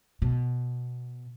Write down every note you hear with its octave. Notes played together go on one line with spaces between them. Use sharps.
B2